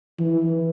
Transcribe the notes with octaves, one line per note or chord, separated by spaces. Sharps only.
E3